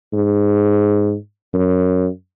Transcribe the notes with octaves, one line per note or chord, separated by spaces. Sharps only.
G#2
F#2